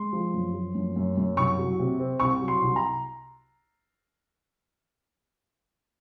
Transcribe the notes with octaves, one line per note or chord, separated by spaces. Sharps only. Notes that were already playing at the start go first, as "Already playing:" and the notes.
Already playing: G#3 C6
F3
F#2
F3
F#2
F#2
F#2
C2 C#6
F#3
C3
C4
C2 C#6
F#3
C6
C2
A#5